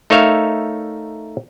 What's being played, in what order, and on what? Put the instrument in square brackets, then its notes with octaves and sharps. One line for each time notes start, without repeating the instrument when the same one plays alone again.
[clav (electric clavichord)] A3 D#4 A#4 C#5 E5 F5